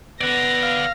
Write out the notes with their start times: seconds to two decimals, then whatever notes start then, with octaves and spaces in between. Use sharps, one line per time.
0.21 B3 D5 F#5 A#6
0.63 F5